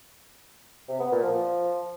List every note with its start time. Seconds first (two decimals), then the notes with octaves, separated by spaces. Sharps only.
0.88 C3
1.00 B3
1.12 A#2
1.23 F3